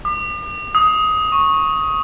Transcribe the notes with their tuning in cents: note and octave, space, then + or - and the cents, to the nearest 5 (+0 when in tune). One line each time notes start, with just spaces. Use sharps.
D6 +45
D#6 +15
C#6 -10